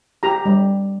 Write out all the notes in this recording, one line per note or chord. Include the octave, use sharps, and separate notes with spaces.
G4 A#5
G3